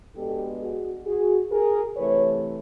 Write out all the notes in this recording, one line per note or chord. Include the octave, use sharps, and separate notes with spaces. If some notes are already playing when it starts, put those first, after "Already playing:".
B2 G#3 B3 D4 G4 A4
F#4 G#4
F#4 G#4
G#4 A#4
C3 E3 A3 B4 C#5